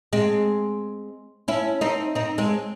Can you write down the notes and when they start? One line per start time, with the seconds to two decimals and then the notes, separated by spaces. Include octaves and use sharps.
0.13 G#3 C4
1.48 C#4 E4
1.81 C4 D#4
2.15 C4 D#4
2.38 G#3 C4